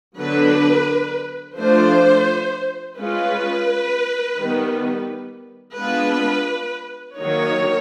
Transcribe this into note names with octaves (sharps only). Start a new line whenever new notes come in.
D3 F#3 B3 D4 B4
F3 A3 D4 F4 C5
G#3 C#4 F4 B4
D#3 G3 B3
G#3 B3 D4 F4 B4
D#3 F#3 A#3 D#4 C#5